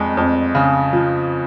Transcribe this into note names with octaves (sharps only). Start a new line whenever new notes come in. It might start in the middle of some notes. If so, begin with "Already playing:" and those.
Already playing: F2 G#3
F2
C#3
F3